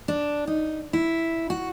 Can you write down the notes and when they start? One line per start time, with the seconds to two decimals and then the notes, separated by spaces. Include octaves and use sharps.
0.08 D4
0.47 D#4
0.93 E4
1.50 F#4